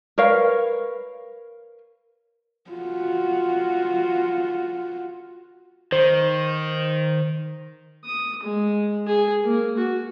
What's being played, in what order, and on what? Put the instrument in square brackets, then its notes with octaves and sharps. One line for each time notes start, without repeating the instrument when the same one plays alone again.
[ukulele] A#4 B4 C#5 F5
[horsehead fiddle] F4 F#4
[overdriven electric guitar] D#3 [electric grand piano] C5
[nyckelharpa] D#6
G#3
G#4
A#3
F#4